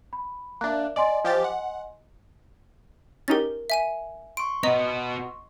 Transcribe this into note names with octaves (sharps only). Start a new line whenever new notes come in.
B5
A#3 D4 E5 F#6
D5 D#5 G#5 C6
F3 G4 A6
F#5
C#4 D#4 G4 A#4 A6
E5 G#5 D#7
C6 C#6 D7
B3 F#4 D#5 A#5